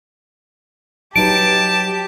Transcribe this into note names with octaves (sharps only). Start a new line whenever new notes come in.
F#3 D#4 G4 B4 A5 D7